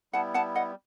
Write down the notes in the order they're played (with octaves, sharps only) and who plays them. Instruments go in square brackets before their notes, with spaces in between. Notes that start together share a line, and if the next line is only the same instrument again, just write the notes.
[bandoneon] G3 B3 E4 [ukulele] F#5 A5
[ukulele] F#5 A5
D#5 F#5